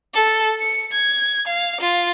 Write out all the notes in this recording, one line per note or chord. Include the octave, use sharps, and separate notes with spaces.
A4
C#7
G#6
F5
F4